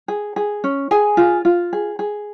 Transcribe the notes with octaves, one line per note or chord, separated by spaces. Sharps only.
G#4
G#4
C#4
G#4 G#5
F4
F4
G#4
G#4